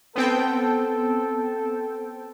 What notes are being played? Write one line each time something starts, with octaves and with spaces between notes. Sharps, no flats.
B3 C4 A4 G5